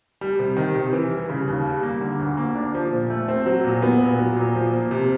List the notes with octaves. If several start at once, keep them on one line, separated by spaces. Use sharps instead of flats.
G3
C3
D#3
C3
E3
G3
C#3
D#2
G3
A#3
D3
D2
A#3
D4
F3
A#2
A3
C4
F#3
A#2
B3
A#2
F#3
A#2
F3
A#3
C3